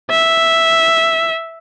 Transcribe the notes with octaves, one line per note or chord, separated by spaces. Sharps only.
E5